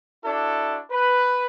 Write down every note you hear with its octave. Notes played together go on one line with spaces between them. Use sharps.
D4 E4 F#4 A4
B4